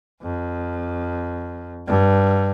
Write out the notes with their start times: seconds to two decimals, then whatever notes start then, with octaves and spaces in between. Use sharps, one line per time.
0.22 F2
1.87 G2